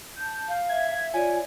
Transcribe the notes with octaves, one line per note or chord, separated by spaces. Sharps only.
A5 G6
F5
E5 G#6
F4 C#5 D5 G#5